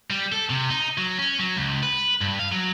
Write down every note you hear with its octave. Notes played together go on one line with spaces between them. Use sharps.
G3
A4
C3
D#4
F#3
C#4
F#3
C#2
B4
G2
F5
F#3